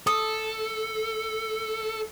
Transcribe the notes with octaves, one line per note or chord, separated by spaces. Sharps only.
A4 D#6